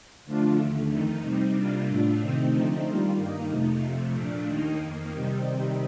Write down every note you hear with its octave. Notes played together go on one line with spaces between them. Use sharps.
D3 F3 A3 D4 F4
D#2 D3 A3
F2 D#3 A3 D#4
C3 G3 C4 D#4
C3 G3 A#3 D4 F4
A2 A3 D4 F4
C3 D#3 A3 C4 D#4
D3 F3 A3 C4 D#4
D#3 G3 A#3 F4
G2 D#3 A#3 D#4
F2 C3 F3 A3 D#4
F2 C3 F3 A3
A#2 F3 A3 D4
D#2 D#3 A#3 D#4
F2 D#3 A#3
C3 D#3 G3 C4 D#4